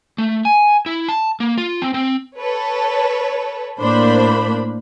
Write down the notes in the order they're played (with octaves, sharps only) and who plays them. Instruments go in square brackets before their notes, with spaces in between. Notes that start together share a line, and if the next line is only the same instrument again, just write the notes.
[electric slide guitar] A3
G#5
E4
A5
A#3
F4
C4
C4
[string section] A4 B4 C#5
A2 A#3 D4 C5 B5